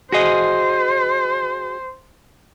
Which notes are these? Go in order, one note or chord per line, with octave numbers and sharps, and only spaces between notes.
F#4 G#4 C5 D#5